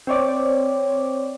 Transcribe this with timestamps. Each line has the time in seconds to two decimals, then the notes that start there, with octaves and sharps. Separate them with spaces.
0.07 C4 C#5 D5